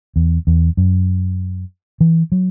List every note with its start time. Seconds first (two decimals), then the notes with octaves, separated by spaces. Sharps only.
0.16 E2
0.47 E2
0.77 F#2
2.00 E3
2.32 F#3